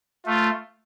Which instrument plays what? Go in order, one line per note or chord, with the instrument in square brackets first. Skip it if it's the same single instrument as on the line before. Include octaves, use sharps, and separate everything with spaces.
[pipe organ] A3 [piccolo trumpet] F4